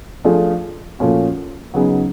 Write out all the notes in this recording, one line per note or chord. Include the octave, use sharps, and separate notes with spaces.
F3 A3 D4 F4 G#4
A#2 F3 A3 C#4 F#4
C#3 F#3 B3 D#4 G#4